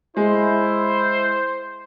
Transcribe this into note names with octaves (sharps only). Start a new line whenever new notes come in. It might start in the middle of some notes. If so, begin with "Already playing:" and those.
G#3 E4 C5